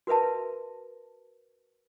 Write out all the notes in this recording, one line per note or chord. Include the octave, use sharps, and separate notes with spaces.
F#4 A#4 B4 E5 A5